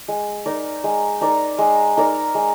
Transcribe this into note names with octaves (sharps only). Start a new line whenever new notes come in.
G#3
D#4 A#4 D5
G#3
D#4 A#4 D5
G#3
D#4 A#4 D5
G#3